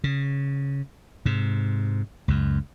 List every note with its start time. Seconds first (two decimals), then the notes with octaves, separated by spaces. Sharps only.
0.04 C#3
1.26 G#2 C3
2.28 C#2 F#2